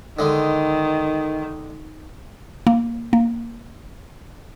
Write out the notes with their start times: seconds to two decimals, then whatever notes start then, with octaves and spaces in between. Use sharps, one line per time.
0.19 D3 D#3 G#3
2.67 A#3
3.13 A#3